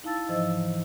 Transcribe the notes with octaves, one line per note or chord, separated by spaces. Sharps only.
D#4 E4 F5 A5 E6 A6
G#2 E3 F3 C5 D#5 E6